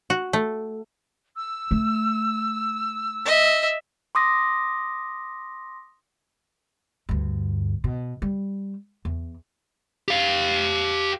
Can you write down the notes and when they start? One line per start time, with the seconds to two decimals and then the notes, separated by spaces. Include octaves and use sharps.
0.10 F#4
0.33 A3
1.36 E6
1.71 A3
3.25 D#5 E5
4.15 C6 D6 D#6 A#6
7.09 D2 G2
7.84 B2
8.22 G3
9.05 E2
10.08 G4 F5